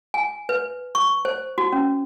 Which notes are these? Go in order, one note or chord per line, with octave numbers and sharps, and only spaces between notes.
G#5
B4
C#6
C5
F#4
C#4